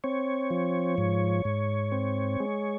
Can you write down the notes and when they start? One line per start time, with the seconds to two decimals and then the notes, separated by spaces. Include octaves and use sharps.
0.04 C4 C#5
0.50 F3
0.98 G#2
1.45 G#2
1.92 C4
2.40 G#3